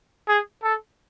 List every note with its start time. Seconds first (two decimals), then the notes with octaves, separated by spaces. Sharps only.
0.28 G#4
0.63 A4